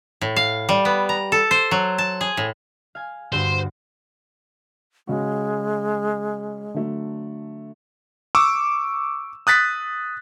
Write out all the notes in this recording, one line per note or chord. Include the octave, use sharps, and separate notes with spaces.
A2
F5
G3
B3
A#5
A4
C5
F#3
A5
G#4
A2
F5 G#5
D2 G2 C5
C#3 G#3 F#4
D3 F#3 A3
C#6 D6 E6
D#6 F#6 A6 B6